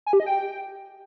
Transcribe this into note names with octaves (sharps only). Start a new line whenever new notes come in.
G#5
G4
D#5
G5